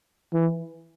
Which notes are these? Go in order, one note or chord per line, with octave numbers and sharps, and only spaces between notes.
E3